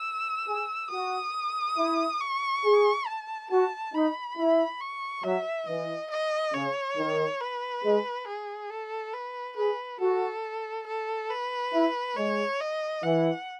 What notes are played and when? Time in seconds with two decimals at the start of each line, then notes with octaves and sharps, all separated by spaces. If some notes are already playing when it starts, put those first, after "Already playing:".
Already playing: E6
0.47 G#4
0.90 F#4 D#6
1.78 E4
2.21 C#6
2.64 G#4
3.07 A5
3.50 F#4 A5
3.94 D#4 B5
4.38 E4
4.81 C#6
5.24 F#3 E5
5.67 E3 D#5
6.11 D#5
6.54 C#3 C#5
6.97 D#3
7.41 B4
7.84 G#3
8.27 G#4
8.70 A4
9.14 B4
9.57 G#4 B4
10.00 F#4 A4
10.87 A4
11.30 B4
11.73 E4
12.17 G#3 C#5
12.60 D#5
13.04 E3 F#5